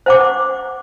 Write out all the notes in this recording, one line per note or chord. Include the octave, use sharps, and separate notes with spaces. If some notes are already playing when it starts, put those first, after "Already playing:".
C5 F#5 D6